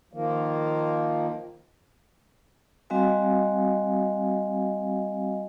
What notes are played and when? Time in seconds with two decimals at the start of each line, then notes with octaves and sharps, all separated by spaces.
0.13 D#3 F3 A#3
2.90 G3 C4 F#4 D#5 F5 G#5